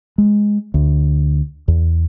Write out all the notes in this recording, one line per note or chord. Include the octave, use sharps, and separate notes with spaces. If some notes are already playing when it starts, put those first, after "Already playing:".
G#3
D2
E2